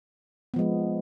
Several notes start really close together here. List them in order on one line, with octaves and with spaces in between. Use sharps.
B3 F3 G#3